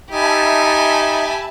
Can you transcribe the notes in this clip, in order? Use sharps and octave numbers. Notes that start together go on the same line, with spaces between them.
D#4 G4 E5 G#5 A5 B5